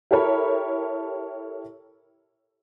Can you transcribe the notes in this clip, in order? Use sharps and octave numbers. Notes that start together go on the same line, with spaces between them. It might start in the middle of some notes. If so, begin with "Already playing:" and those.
E4 G4 A4 A#4 C#5 B5